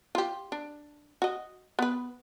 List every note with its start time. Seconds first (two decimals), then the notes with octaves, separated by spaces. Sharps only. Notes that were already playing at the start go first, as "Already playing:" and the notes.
0.15 F4 G4
0.52 D4
1.22 F#4 D#5
1.79 B3 B4